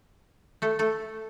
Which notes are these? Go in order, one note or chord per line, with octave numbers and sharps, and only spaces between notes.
A3 A4
A3 A4